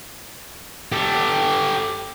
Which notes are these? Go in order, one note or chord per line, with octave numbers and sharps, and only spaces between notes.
G4 A4